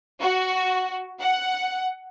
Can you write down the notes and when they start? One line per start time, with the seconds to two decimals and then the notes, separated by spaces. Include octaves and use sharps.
0.20 F#4
1.20 F#5